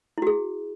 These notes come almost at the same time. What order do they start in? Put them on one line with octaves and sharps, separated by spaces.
E4 F#4 G#4